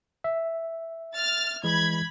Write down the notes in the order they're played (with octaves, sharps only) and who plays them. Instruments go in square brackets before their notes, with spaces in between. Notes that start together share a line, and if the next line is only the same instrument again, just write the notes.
[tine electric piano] E5
[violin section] F6 A6
[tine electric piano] E3 G#3 [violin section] B5 G#6